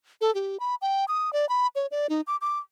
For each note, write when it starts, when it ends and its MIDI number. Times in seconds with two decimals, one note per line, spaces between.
0.21 0.33 69
0.35 0.60 67
0.60 0.75 83
0.82 1.05 79
1.08 1.33 87
1.33 1.48 74
1.49 1.67 83
1.75 1.87 73
1.91 2.09 74
2.09 2.21 63
2.27 2.37 86
2.41 2.59 86